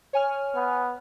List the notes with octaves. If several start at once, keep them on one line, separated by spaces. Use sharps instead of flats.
C#5 G#5 F6
B3